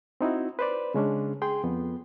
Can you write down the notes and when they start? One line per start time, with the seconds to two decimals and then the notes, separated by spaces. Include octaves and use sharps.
0.21 C4 D#4 E4 F#4
0.59 B4 C5 D5
0.94 C#3 G#3 C#4 D4
1.42 G#4 G5 C6
1.64 F2 B3